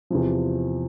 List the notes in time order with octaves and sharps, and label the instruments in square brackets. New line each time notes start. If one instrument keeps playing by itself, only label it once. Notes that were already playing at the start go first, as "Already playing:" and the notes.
[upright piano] E2 C3 F3